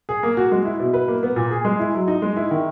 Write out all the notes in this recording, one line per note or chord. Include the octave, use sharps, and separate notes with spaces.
G#4
A#3
F#4
G#3
E4
B2
B4
A#3
B3
A#2
G#4
G#3
E4
F#3
D#4
G#3
E4
D#3